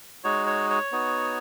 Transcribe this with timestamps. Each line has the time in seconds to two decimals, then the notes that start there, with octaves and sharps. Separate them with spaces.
0.24 G#3 D#4 F#4 C#5
0.47 C#5
0.70 C#5
0.92 B3 D#4 F#4